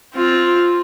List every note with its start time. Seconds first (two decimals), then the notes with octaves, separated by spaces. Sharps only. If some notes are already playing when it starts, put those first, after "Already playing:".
0.15 C4 F4